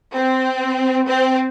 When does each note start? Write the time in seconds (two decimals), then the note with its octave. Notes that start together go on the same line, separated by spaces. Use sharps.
0.13 C4
1.07 C4